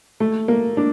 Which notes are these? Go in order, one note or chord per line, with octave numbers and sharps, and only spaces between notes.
A3
A#3
D4